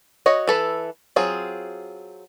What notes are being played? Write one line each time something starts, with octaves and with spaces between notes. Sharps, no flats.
F#4 C#5 D#5
E3 A4 B4
F#3 C4 F4 G#4